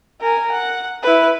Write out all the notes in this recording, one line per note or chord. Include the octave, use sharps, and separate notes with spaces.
A#4 G#5
F#5
E4 B4